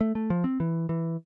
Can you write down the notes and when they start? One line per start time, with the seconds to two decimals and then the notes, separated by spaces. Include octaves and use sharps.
0.01 A3
0.15 A3
0.30 F3
0.44 C4
0.60 E3
0.89 E3